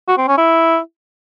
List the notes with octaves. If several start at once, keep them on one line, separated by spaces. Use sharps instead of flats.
F#4
C4
C#4
E4